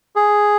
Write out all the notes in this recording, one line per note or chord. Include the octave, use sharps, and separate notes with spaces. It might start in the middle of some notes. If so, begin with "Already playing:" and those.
G#4